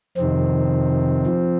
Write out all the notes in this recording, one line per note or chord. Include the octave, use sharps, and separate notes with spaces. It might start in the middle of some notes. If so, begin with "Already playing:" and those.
F2 C3 D#3 C4
F3